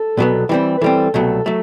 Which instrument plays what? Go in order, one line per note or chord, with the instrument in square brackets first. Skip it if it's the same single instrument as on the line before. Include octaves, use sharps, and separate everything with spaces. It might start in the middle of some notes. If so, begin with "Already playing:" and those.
Already playing: [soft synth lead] A4
[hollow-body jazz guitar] C2 B2 F#3 B3
E3 G3 C4
[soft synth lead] B4
[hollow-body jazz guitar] E3 G3 C4 [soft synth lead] A4
[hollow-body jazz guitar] C2 B2 F#3 A3 [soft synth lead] A4
[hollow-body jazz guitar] F#3 A3 [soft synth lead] A4